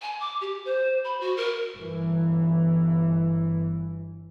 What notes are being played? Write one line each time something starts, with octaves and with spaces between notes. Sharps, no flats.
G#5
D6
G4
C5
B5
F#4
A#4
G1 E3